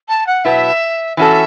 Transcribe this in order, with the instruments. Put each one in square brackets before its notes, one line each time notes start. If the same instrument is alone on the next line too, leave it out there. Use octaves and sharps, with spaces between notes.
[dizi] A5
F#5
[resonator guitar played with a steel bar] B2 F#3 B3 E4 [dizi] E5
[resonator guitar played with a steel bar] E3 C#4 F#4 A4 [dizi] E5